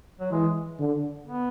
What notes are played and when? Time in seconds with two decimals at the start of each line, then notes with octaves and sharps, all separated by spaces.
0.19 F#3
0.31 E3 G#3
0.80 D3
1.27 B3